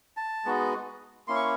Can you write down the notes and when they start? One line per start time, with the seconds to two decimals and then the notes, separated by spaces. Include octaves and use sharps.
0.17 A5
0.45 G#3 B3 D#4 F#4
1.28 A#3 C#4 E4 C6
1.36 C#6